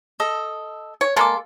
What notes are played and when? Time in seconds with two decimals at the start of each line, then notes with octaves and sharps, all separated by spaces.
0.20 A4 D#5
1.01 C#5
1.16 G#3 A#3 A4 C6 D6